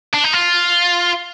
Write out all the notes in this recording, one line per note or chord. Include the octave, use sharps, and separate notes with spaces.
D4
D#4
F4